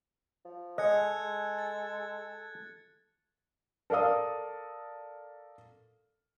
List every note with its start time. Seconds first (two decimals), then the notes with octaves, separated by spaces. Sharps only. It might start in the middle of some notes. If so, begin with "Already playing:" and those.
0.45 F3
0.78 G#3 A4 D#5 F#6 G#6 C#7
1.19 G#3
1.59 A6
3.90 A4 A#4 D5 F5 D#6